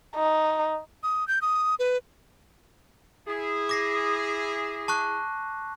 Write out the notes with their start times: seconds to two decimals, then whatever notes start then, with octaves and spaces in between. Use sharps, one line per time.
0.16 D#4
1.03 D#6
1.28 G6
1.42 D#6
1.79 B4
3.27 E4 G#4
3.69 D6 A#6 C7
4.88 A5 C#6 F#6